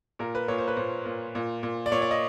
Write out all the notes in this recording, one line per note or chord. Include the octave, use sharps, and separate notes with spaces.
A#2 A#4
B4
A#2 C#5
C5
B4
A#2 C5
A#2
A#2
A#2
D5
A#2 C#5
D5
D#5